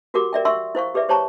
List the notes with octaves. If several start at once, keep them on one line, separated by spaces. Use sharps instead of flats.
F#4 G4 A#4 F#5 D6
A#4 D5 E5 G5
E5 F#5 C6 C#6 E6
E4 C5 F5 C#6
G4 G#4 B4 D5 E5
G4 C5 C#5 A5 A#5 C#6